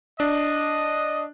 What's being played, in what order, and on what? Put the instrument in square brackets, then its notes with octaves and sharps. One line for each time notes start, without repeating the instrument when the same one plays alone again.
[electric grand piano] D4 [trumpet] D#5